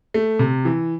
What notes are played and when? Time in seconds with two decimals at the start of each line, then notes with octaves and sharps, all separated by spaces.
0.14 A3
0.39 C3
0.65 E3